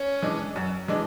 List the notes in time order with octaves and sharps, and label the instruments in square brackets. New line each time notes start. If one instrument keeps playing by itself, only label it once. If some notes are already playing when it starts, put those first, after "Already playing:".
Already playing: [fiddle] C#4
[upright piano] E3 G#3 D4
F#2
E3 G#3 D4